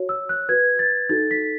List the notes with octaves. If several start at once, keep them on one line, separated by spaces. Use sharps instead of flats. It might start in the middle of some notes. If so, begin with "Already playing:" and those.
Already playing: F#4 C#5
E6
F#6
F#4 B4 G#6
A6
D#4 F#4 A4 A6
B6